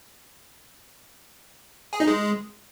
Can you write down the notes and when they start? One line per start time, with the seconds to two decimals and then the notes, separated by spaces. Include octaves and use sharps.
1.93 G#4
2.00 D#4
2.07 G#3